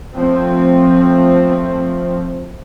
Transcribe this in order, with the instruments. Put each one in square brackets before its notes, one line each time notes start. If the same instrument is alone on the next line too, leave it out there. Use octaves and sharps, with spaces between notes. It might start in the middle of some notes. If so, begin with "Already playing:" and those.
[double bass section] F3 A3 C4